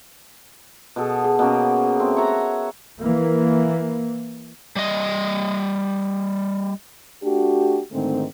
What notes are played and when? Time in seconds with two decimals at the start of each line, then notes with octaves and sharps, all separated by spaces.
0.96 B2 G#4 A4
1.24 G#4
1.39 B2 A#3 C#4
1.99 A3 C4
2.17 C#5 E5 F#5 A#5
3.02 E3 A#3
4.76 G3 D#5
7.23 A3 D4 F#4 G4
7.92 G#2 D3 D#3 G#3 A3 C4